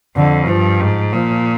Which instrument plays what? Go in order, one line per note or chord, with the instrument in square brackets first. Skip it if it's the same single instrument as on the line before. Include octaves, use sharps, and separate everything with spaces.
[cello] F2 [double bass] D3
[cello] G2 [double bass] F3
[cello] G#2
[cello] A#2 [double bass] F3